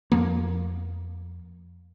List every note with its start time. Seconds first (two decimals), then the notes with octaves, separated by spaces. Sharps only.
0.12 F2 F3 A#3